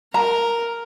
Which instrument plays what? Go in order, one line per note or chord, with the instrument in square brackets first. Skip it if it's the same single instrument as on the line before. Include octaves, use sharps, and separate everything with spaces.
[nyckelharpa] A#4 [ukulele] A#5